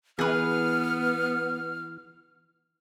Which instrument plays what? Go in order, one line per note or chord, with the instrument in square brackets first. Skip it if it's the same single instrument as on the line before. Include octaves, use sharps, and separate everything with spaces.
[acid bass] E3 [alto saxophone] B3 [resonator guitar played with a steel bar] G#4 B4 [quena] F6